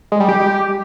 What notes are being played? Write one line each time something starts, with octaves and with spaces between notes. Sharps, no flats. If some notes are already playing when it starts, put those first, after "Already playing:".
G#3
G3
G4